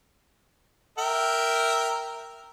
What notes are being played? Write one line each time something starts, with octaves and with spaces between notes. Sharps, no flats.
A#4 E5 G5